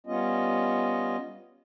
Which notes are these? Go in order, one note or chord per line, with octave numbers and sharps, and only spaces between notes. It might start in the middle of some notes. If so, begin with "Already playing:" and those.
G3 B3 C#4 F4 D#5